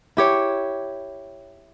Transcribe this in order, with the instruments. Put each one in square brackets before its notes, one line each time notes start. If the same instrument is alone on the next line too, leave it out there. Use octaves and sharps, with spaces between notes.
[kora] E4 G4 C#5